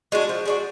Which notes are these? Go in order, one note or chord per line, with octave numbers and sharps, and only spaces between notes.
G#3 D4 F#4
F3
G#3 D4 F#4